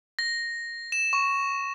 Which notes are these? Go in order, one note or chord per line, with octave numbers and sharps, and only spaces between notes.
A#6
E7
C#6